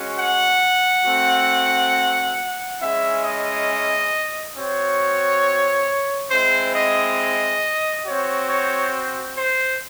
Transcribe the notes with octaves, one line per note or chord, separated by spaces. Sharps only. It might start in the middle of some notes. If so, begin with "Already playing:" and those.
Already playing: G#3 C#4 F#4
F#5
A3 C4 F#4
G#3 C#4 E4 E5
D#5
C4 F#4 C#5
G#3 C4 E4 C5
D#5
C4 F#4 C#5
C#5
C5